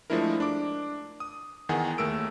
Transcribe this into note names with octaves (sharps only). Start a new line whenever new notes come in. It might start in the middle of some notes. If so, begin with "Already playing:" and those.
F3 G#3 A3 D4 E4 A#4
D4 D6
D#6
E2 D#3 G#4 F#5 G#5
D#2 A3 A#4 E6 D7